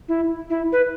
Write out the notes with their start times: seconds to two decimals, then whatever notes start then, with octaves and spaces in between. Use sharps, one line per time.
0.09 E4
0.50 E4
0.72 B4